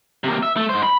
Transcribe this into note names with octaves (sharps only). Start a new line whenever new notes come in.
C3 A#3
E5
A3
G#2 C5
B5